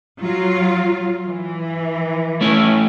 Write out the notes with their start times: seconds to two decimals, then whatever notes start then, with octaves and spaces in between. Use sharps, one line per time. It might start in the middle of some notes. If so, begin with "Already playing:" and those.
0.19 F#3 F4
1.27 E3
2.41 A3 C#4 E4